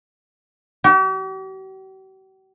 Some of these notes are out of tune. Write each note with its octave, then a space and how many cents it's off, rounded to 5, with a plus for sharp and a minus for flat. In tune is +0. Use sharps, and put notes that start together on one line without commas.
G4 -45